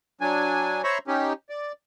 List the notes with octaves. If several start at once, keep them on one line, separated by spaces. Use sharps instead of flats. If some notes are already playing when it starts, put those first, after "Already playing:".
F#3 D4 G#5
C5 C#5 E5 A#5 B5 C#6
C#4 D#4 G4
D5